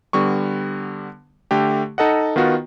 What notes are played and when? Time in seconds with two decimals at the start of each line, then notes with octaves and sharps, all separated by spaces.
0.13 D3 G3 B3 C#6
1.51 D3 A3 G4
1.98 D#4 A4 D#5 F#5
2.36 D#3 B3 F4 F#4